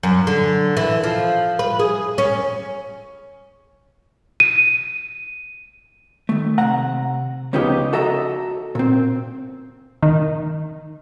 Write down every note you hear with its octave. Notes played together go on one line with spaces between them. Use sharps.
F#2
D3
E3
F3
B4
G#4
C#4
D#7
D#3 A3
C3 F#5 A#5
C#2 C#3 F3 B3 D#4 G4
F#4 A4 D#5 E5 A#5
A#2 C4
D#3